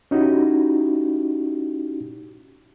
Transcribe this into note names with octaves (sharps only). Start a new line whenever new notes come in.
C#4 D#4 E4 F#4 G4